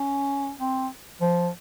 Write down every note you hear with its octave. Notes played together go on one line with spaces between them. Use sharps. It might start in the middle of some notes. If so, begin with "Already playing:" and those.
Already playing: C#4
C4
F3